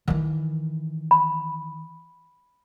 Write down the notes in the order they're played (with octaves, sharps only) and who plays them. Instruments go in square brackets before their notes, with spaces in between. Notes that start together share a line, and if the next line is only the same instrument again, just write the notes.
[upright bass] D#3 E3
[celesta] B5